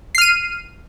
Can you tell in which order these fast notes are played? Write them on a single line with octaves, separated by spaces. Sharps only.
C7 F6 D#7